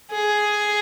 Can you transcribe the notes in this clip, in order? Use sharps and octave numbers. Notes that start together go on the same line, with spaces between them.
G#4